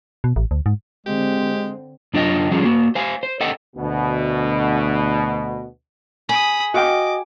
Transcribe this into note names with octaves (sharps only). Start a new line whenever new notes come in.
B2
A1
D2
G#2
D3 G#3 C4 G4
F#2 D4 F4 D#5 G5
F3 G3 C#4 F4 G#4
A#3 F#4
C5 F5 G#5
C5
A4 D#5 F#5 G5
D2 B2
G#4 B5 D#6
F#4 D#5 F5 G5 D6